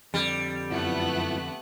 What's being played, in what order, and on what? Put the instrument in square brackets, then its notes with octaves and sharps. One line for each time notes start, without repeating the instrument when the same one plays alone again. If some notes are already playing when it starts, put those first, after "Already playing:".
[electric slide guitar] F2 D3 [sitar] G3
[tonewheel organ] F#2 F3 E4 [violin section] A3 B3 F#6